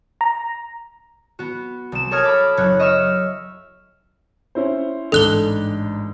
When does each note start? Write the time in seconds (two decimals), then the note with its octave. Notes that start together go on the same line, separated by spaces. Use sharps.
0.21 A#5
1.39 B3 F#4
1.92 C2 E7
2.11 A4 A#4 C#5 D#6 F6 G#6
2.23 A4 B5 D6
2.57 F#1 C#5 F#6
2.79 D#5 E5 C#6 E6 F6
4.55 C#4 E4 C5
5.12 A1 G#2 D4 A4 F#6 G7